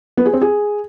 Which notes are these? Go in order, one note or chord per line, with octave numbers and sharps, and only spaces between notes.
B3
G#4
C4
G#4